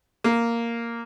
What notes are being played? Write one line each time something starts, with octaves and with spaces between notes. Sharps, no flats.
A#3